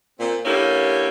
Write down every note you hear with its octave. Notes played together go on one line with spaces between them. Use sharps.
A#2 C4
D3 A#3 C#4 E4 G4